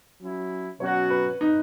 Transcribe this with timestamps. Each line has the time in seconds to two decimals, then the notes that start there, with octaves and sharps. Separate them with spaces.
0.20 F#3 C#4 E4
0.80 B2 F#3 C#4 F#4 C#5
1.10 B4
1.41 D#4